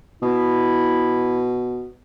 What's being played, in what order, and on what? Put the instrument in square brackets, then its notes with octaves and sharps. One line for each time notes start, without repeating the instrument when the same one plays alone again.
[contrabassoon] B2 [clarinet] E4